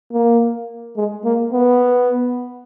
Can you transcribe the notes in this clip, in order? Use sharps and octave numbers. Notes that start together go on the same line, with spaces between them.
A#3
G#3
A#3
B3